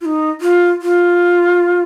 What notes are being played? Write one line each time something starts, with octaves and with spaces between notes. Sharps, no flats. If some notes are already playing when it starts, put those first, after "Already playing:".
F4
D#4
F4
F4